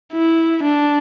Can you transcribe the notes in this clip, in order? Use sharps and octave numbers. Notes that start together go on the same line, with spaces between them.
E4
D4